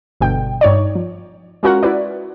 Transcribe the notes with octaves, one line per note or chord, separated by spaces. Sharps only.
G1 G2 B2 D3 G5
G2 D#4 C#5 D5
F3
G#3 C#4 F4 F#4 A#4 F#5
E4 F#4 B4 D5